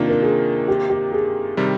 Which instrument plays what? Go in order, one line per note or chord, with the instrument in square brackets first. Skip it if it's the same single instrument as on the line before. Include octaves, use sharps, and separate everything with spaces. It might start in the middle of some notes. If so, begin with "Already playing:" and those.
Already playing: [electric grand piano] C3 D#3 A#3 [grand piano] D4 F4
[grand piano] A#4
G#4
G4
G4
G#4
[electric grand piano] C3 D#3 G3